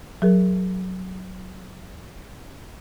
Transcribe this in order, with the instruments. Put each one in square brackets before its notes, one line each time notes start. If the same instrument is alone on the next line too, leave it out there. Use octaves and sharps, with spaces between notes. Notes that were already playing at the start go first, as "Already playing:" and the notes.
[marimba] F#3 G#4 A#4